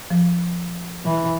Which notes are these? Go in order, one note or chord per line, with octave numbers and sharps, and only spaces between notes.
F3
E3